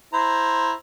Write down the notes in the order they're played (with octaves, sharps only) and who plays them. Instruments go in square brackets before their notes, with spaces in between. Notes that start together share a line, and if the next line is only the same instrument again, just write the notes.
[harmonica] E4 C5 A#5